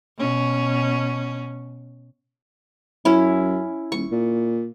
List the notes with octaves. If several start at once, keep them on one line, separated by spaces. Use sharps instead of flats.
B2 C#4
F#2 C#4 E4
D#1 C#6
A#2